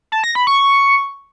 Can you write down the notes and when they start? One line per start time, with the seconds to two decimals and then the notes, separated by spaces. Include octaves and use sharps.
0.12 A5
0.24 A#6
0.35 B5
0.47 C#6